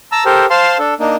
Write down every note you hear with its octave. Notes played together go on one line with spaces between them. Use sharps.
A5 A#5 E6
G4 A4 A#4 C5
C5 F5 A5 C6
D4 A4
A#3 D4 D#4